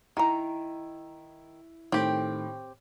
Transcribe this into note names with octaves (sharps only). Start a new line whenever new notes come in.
D#3 E4 A#5
A2 D#3 C4 G4